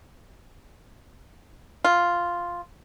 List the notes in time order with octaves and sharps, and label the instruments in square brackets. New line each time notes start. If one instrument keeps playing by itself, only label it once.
[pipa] F4